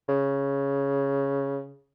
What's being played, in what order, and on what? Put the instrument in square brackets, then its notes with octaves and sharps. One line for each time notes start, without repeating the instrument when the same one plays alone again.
[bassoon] C#3